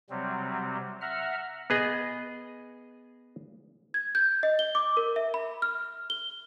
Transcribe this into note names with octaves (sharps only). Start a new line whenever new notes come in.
C3 F#3 G3 C4
E5 F#5 A#5 F6
B3 G#4 D#5
G#6
G6
D#5
G7
D6
A#4
E5
B5
F6
G7